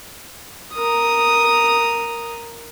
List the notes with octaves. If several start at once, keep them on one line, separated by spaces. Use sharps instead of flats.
A#4 D#6